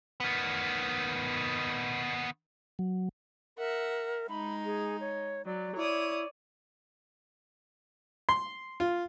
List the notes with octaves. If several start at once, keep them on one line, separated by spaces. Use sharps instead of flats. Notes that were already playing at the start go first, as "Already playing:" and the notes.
D#3 B3
F#3
A#4 E5 F#5
G#3 D#4 B5
G#4
C#5
F#3 D5
E4 C#5 D5 D#6
C6
F4